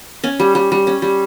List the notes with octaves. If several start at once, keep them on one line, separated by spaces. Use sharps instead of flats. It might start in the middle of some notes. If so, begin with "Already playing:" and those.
C#4 G#5
G3
G3
G3
C#4
G3